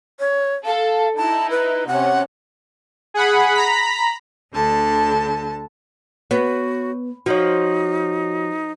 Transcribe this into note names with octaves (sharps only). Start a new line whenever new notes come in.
C#5
A4 F5
D#4 E4 A5
B4
C3 C#4 F#5
G#4 F#5 B5
A#5 B5 B6
D2 D3 A5
B3 F#4 C#5
F3 D#4 F#4 C#5